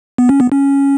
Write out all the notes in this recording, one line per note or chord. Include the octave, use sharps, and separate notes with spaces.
B3
C#4
B3
C#4